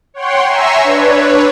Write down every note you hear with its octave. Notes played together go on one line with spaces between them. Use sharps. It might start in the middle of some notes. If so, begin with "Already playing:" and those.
C#5 F#5 G5 C6
E5 G#5 A#5 C6 C#6 E6
D4 B4 C#5